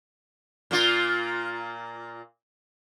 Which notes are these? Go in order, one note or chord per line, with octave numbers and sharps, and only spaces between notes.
A#2 A#3 F4